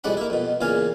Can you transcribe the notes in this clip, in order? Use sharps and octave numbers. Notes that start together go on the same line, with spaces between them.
C2 F2 G#3 D5 F#5 B5
A#3 E4
F2 B2
E2 A#2 C#3 F5 G#5